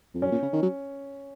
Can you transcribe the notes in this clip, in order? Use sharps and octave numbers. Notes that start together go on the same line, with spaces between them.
F2
F#2 C#4
A#2
C#3
D#3
F#3